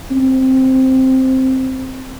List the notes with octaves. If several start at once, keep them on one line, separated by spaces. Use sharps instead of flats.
C4